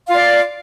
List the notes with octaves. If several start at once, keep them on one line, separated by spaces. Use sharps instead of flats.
F4 D5 F5